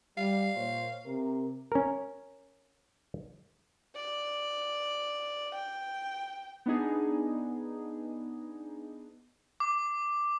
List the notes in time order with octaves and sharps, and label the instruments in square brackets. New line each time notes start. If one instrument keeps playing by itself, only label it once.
[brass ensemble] G3 [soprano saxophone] F5
[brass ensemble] A#2 C5 C#5
C3 A#4
[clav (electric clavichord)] C#4 A#4
[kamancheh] D5
G5
[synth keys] B3 D4 D#4 G#4
[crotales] D6